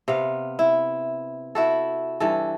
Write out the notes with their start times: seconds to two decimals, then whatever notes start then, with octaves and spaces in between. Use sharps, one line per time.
0.08 C3 B3 F5
0.59 E4
1.55 E4 F#4 A4
2.20 G2 E3 A4